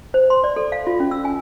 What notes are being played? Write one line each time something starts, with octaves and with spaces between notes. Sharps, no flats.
C5
C6
D5
A4
F5
F4
C#4
E6
G#5